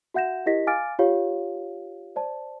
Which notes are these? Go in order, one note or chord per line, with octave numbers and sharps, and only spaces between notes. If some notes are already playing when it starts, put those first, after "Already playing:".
F#4 E5 F#5 G6 A#6 E7
E4 G4 A#4 D#5 A#6 B6
F5 G#5 D6 F6 A6 D7
F4 G4 C#5 F5
C5 D5 A5